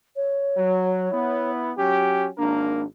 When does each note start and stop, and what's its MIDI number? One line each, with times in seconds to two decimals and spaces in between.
0.16 1.51 73
0.57 1.09 54
1.12 1.72 59
1.12 1.72 64
1.77 2.28 54
1.77 2.28 61
1.77 2.28 67
2.38 2.83 32
2.38 2.83 58
2.38 2.85 62
2.38 2.83 70